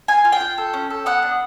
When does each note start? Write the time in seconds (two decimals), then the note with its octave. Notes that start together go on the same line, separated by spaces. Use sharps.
0.08 F4 G#5
0.25 F4
0.32 G5
0.41 F4
0.58 A4
0.73 C#4
0.90 A4
1.06 B3 F#5
1.22 D4